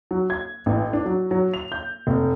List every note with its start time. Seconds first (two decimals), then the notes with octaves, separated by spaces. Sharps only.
0.11 F#3
0.30 G#6
0.66 A1
0.93 D4
1.06 F#3
1.31 F#3
1.54 F7
1.72 G6
2.07 F1